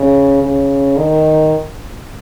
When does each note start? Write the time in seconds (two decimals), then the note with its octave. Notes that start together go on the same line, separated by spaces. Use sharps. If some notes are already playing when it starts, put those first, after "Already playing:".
Already playing: C#3
0.43 C#3
0.97 D#3